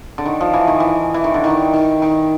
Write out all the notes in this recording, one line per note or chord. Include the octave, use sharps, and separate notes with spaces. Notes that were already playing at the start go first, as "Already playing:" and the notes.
D3
D#3
F3
E3
D#3
E3
E3
D#3
D3
D#3
D#3
D#3